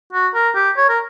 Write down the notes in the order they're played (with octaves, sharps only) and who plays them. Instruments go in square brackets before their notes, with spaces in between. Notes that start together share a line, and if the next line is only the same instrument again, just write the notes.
[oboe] F#4
A#4
G4
C#5
A#4